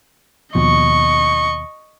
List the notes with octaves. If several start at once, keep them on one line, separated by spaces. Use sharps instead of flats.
D#2 B2 F3 D#5 C#6